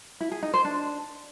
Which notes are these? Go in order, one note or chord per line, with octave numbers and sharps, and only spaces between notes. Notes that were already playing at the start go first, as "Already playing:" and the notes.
E4
G#4
D#4
C5
D4